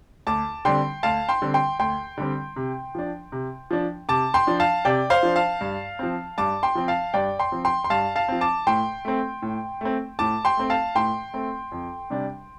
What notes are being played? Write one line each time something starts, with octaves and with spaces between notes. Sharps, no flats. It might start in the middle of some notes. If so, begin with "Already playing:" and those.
D2 A5 D6
D3 G3 C4 G5 C6
D2 F5 A5
G5 C6
D3 G3 C4
G5 C6
D2 G5 C6
D3 G3 C4
C3
F3 D4
C3
F3 D4
C3 A5 D6
G5 C6
F3 D4
F5 A5
C3 D5 G5
C5 F5
F3 D4
F5 A5
G2
F3 C4
G2 A5 D6
G5 C6
F3 C4
F5 A5
G2 D5 G5
G5 C6
F3 C4
G5 C6
C6
G2 F5 A5
F5 A5
F3 C4
A5 D6
A2 G5 C6
A3 C4
A2
A3 C4
A2 A5 D6
G5 C6
A3 C4
F5 A5
A2 G5 C6
A3 C4
F2
C3 G3 D4